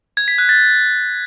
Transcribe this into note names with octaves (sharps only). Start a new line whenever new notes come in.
G#6
B6
F#6
A6